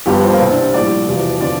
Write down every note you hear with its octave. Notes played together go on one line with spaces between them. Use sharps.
G1 G2 F3 G4
C4
A#3
C2 C3 G3 C4
D4
A#1 A2 G3 D5
E1 E2 C3 F3
D3 F3 D5